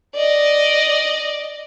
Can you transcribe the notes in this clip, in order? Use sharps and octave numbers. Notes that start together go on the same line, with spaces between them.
D5 D#5